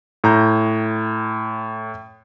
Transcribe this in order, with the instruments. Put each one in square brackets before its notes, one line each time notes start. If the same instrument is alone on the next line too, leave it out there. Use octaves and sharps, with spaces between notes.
[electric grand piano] A2 A#5 G6